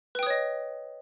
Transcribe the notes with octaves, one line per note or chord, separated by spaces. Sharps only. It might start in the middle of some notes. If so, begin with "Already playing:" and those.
B4 C#5 D#5 G5 D#6